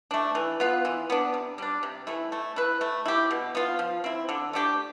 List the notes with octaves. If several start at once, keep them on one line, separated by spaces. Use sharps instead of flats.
A3 D4
E3
B3 F4 B4
E3
B3 D4
C3
G3 D4
C3
E3 A3 E4
A3
E4 B4
A3
E4 G4
B2
B3 F4
F3
C4 E4
D3
A3 D4 G4